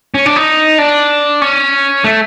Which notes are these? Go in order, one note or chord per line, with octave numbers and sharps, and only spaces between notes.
C#4
D4
D#4
D4
C#4
A3